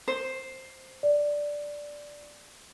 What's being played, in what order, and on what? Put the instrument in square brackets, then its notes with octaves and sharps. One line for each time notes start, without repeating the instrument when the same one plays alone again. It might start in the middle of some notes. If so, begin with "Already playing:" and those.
[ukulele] C5
[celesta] D5